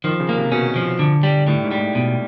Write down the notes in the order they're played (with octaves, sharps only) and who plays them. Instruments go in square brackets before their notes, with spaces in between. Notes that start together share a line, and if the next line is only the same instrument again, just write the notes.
[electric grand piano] D#3 [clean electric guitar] F3
[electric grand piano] C#3
[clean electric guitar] A#3
[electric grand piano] C3
[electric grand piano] B2 [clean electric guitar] C#4
[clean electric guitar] F3
D3
G3
[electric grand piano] A2 [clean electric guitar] G3
[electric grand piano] G#2
[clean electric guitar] G3
[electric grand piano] A2
[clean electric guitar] B2